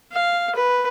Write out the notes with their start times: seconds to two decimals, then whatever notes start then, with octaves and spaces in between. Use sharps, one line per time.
0.13 F5
0.55 B4